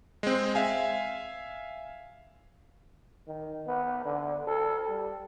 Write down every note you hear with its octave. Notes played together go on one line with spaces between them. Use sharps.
G#3 C4
E5 F5 G#5
D#3
B3
D3
A4
G3